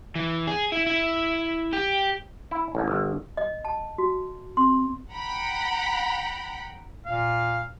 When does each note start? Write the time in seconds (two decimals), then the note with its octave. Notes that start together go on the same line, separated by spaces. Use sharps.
0.15 E3
0.47 G#4
0.72 E4
0.86 E4
1.73 G4
2.51 E4
2.75 A1
2.88 G1
3.37 D#5
3.65 A5
3.98 F#4
4.57 C4 C6
5.13 F#5 G5 A#5 B5
7.06 A#2 F5